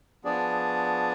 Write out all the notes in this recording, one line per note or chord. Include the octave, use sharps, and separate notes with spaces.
F3 B3 D4 G#4 D5